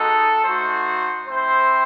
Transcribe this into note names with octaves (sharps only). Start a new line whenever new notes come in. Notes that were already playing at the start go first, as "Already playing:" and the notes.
Already playing: G#3 D#4 F#4 A4
A3 D#4 F#4 C5
C4 E4 C5